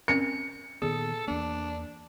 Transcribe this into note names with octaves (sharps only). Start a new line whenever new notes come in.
C4 C#4 A#4 C#7
A#2 D#3 B3 G#4 A4
E2 A#3 D4